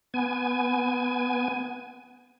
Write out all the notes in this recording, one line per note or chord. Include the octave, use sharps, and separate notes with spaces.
B3 G#5